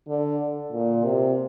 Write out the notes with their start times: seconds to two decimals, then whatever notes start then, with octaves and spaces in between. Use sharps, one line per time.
0.08 D3
0.72 A#2
1.04 C3